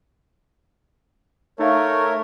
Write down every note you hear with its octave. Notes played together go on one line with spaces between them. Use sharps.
A3 D#4 A#4 C#5 E5 F5